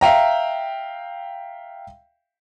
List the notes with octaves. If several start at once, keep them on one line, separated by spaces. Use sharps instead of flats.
E5 F5 G5 A#5